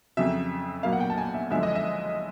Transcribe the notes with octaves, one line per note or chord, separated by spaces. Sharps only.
F2 C#3 F#3 E5
B1 A#2 F#3 A#3 F5
F#5
G5
A5
G#5
E5
F#1 F#2 D3 F3 G#3 E5
D#5
E5